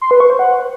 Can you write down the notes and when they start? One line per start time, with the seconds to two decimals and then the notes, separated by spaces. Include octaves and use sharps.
0.01 C6
0.11 B4
0.20 C#6
0.30 C5
0.39 F#5